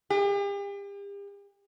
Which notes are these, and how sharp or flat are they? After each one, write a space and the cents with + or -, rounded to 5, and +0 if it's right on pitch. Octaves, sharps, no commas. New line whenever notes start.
G4 +40